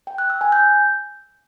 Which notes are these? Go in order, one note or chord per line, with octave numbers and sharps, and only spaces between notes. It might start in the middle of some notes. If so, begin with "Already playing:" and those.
G5
F#6
E6
G#5
G6